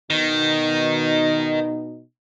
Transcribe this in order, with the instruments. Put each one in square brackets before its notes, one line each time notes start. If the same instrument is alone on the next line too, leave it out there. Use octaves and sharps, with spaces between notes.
[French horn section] B2 D#4 [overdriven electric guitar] D#3